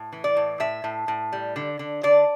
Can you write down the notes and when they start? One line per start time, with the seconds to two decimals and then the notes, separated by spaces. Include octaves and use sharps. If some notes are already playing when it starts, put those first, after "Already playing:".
Already playing: A2
0.13 E3
0.24 D5
0.37 A2
0.60 A2 E5
0.84 A2
1.08 A2
1.33 G3
1.56 D3
1.79 D3
2.03 D3 D5